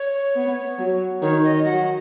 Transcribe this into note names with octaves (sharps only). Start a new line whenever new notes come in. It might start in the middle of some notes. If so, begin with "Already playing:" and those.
Already playing: C#5
B3
F#3
D#3 C#5
D#5
F#3 F#5